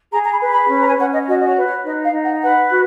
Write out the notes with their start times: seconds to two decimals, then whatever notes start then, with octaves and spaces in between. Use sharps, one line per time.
0.12 G#4 A#5
0.24 A#5
0.31 B5
0.40 B4
0.50 B5
0.69 C#4
0.79 A#5
0.84 G#5
0.97 C#4 F#5
1.12 D#5
1.26 F#4 D#5
1.38 D#5
1.45 C#5
1.55 B4
1.65 C#5
1.84 D#4 D#5
2.03 F5
2.12 D#4
2.22 F#5
2.41 B4 F#5
2.70 F#4